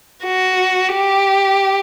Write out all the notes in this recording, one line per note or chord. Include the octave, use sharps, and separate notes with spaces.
F#4
G4